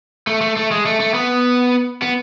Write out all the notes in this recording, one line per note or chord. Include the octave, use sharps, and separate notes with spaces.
A3
A3
A3
G#3
A3
A3
B3
B3